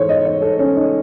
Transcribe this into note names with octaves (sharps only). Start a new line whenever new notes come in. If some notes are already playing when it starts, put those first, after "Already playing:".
Already playing: G#2 E3 A4 C5 C#5
D#5
C#5
A4
C#4
D#4